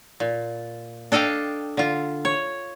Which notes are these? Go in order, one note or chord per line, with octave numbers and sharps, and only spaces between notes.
A#2
D4 A4 D#5 F5 G5
D3 F4
C#5